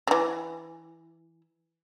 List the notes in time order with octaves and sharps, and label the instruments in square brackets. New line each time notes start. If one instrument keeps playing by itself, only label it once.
[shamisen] C#3 E3